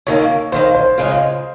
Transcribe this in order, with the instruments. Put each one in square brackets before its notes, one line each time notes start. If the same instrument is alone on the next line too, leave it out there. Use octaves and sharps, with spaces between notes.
[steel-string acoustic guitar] D#2 D#3 A#3 [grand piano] C#5
[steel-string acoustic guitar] D#2 D#3 A#3 [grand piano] C5
[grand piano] C5
[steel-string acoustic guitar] C#3 G#3 C#4 F4 [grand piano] C5